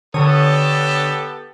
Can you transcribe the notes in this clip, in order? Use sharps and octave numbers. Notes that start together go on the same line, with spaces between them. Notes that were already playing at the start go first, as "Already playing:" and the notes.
D3 B3 G4 A4 C#5 D#6